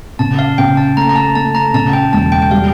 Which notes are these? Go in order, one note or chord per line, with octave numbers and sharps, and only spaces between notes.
C#3 A5
F5
C#3 G5
A5
A3 A#5
A#5
A5
A3 A5
A#5
C#3 A5
G5
E1 A5
G5
G5
G3 F5